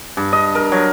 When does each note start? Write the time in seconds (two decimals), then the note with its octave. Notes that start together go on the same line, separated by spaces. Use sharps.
0.17 G2
0.33 D#5
0.55 A#4
0.72 F#3